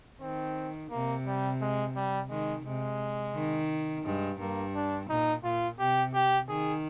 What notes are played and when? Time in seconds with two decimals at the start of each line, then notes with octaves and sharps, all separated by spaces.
0.21 D#3 C4
0.91 C3 A#3
1.26 G3
1.61 G#3
1.96 G3
2.30 D#3 G#3
2.65 C3 G#3
3.35 D#3
4.05 G2 G#3
4.40 G2 A#3
4.75 D4
5.09 A#2 D#4
5.44 A#2 F4
5.79 C3 G4
6.14 G4
6.49 D#3 G#4